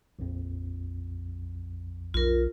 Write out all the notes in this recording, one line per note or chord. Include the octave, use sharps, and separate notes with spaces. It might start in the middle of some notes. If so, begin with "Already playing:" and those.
A#1 F2
B1 F4 A#4